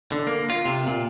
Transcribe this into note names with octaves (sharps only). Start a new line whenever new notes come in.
D3
A#3
F4
C3
A#2